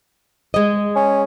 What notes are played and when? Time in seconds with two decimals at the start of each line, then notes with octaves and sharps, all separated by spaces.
0.54 G#3 D#5
0.96 C#4